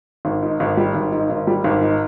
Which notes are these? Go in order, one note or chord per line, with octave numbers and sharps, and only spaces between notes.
G#1
G#2
G#1
G3
G#1
G#2
G#1
G3
G#1
G#2